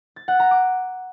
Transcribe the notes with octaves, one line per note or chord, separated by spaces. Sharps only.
A6
F#5
A#5
D6